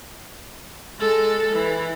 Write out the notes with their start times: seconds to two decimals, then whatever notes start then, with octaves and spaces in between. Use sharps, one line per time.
0.99 G#3 A4
1.52 E3